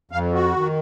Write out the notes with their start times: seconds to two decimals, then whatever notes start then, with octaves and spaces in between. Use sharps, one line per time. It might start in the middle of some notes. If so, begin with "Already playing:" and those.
0.11 F2 F5
0.35 F#4
0.56 D#3